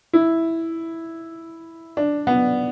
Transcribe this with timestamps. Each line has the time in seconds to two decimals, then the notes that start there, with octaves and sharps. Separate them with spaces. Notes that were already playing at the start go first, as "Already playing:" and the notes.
0.13 E4
1.97 D4
2.27 B3